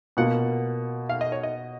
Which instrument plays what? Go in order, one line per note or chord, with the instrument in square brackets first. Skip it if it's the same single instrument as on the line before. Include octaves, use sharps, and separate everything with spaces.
[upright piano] B2 A#3 F4 [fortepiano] F#5
[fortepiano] F5
D#5
C#5
D#5